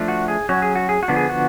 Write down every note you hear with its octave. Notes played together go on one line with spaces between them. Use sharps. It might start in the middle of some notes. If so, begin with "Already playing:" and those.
Already playing: F3 A3 D4
F#4
G#4
F#3 C#4 F#4
G#4
F#4
G#4
F#4
D3 F3 B3 D4
G#4
F#4